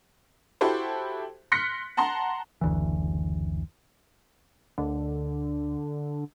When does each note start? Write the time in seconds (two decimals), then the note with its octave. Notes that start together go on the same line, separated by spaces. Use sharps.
0.61 E4 F#4 G4 A4 C5
1.52 C6 F6 F#6 A#6 B6 C#7
1.97 F#5 A5 A#5 C6
2.61 F#1 D2 E3
4.78 D2 D3